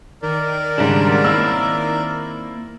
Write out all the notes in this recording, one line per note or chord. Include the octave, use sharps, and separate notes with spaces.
D#3 A#4 D5
G#2 C#3 G3 D4
A#3 C4 E4 E6